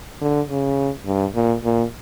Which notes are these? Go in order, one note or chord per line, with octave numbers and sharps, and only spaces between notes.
D3
C#3
G2
A#2
A#2